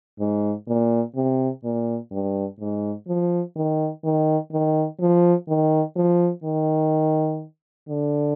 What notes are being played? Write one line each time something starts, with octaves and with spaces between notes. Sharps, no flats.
G#2
A#2
C3
A#2
G2
G#2
F3
D#3
D#3
D#3
F3
D#3
F3
D#3
D3